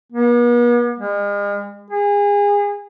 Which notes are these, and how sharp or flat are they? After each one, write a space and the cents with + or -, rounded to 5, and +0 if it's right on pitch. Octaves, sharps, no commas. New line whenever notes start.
B3 -45
G#3 -40
G#4 -30